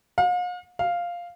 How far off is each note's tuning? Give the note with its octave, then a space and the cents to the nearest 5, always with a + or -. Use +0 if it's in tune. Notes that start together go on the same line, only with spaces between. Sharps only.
F5 +45
F5 +0